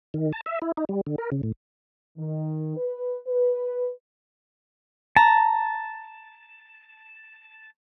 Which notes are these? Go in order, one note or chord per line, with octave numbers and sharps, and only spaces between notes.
D#3
A5
E5
E4
D#4
G3
D3
A#4
C#3
A2
D#3
B4
B4
A5 A#5